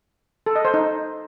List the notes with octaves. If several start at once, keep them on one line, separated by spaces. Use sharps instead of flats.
A4
D#5
C5
D#4